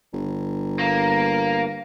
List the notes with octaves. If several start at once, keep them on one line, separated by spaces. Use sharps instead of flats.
G1
A#3